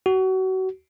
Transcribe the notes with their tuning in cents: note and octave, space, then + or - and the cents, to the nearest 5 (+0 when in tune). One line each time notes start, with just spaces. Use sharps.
F#4 +30